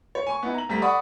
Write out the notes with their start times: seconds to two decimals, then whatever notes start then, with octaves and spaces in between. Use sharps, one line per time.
0.15 C#5
0.27 G#5 C#6
0.43 B3 D#4 E4
0.54 A#5 F#7
0.69 D2 G3 A#5 B6
0.82 D5 F#5 B5 C#6 D#6